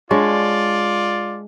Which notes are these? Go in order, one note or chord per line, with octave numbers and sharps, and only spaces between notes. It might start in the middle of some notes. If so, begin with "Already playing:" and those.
G#3 D4 F4 C#5 D5